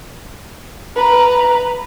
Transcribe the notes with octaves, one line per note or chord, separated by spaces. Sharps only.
B4 A#5